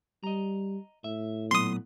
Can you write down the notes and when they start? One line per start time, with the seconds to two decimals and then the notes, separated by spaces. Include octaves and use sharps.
0.24 G3 D#5 A#5
1.04 A2 E5
1.51 A#2 F#3 B3 C6 D#6